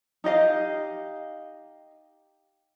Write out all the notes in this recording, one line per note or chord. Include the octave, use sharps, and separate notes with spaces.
D#4 G4 D#5 F5